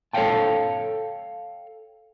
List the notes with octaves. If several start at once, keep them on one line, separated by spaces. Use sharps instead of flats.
A4 C#5 D#5 F5 G5 A5